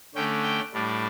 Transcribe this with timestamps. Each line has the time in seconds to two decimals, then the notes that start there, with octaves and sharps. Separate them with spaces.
0.15 D3 A3 C#4 G5
0.43 G5
0.72 A2 G3 D4